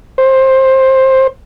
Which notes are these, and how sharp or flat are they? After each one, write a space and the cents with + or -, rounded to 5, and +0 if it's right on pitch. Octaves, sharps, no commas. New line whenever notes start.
C5 +15